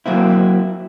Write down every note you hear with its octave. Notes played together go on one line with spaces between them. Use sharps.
F#3 A#3 C4 E4